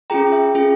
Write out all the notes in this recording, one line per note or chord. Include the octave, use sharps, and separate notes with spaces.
C#4 F4 G#4 G5 A#5
E5 G5
C#4 F4 G#4